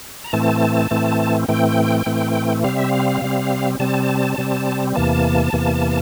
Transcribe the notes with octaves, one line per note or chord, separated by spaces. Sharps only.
A#5
A2 E3 A3 C4 A5
A2 E3 A3 C4
A2 E3 A3 C4 G5
A2 E3 A3 C4
C3 G3 C4 F5
E5
F5
C3 G3 C4
C3 G3 C4 A5
C3 G3 C4
E2 C3 E3 A#3 A5
E2 C3 E3 A#3